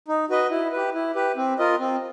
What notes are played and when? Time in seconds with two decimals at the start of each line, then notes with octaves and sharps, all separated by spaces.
0.08 D#4
0.30 F#4 B4 D#5
0.51 E4
0.72 G4 B4
0.94 E4
1.15 G4 B4
1.37 C4
1.59 F4 A#4 D#5
1.79 C4